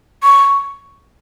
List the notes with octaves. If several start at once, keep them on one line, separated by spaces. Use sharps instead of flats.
C#6